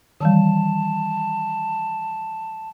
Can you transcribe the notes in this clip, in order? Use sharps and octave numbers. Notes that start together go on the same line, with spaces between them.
D#3 E3 G3 A5